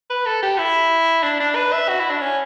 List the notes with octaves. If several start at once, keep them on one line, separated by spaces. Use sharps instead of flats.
B4
A4
G4
E4
D4
D4
B4
E5
F#4
E4
D4
C#4